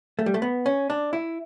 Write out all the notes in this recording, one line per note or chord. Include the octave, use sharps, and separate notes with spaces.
A3
G3
A3
B3
C#4
D4
E4